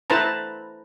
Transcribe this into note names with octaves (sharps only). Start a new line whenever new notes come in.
E4 A4 B4 C5 A5 A#5